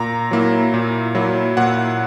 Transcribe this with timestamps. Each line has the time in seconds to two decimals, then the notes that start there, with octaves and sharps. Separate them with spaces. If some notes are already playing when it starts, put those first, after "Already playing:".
Already playing: A#2 A#5
0.31 F#3 A#3 E4
0.74 A#2
1.15 F#3 A#3 E4
1.57 A#2 F#5